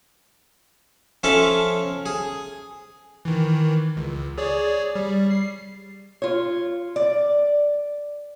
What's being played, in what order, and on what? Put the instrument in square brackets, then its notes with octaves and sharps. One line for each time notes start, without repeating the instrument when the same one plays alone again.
[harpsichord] F3 C#4 A4 E5 F5 A5
G#4
[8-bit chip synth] D#3 E3
C#2
G#4 C#5 D5
G3
C7
[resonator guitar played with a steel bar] F4 C#5
D5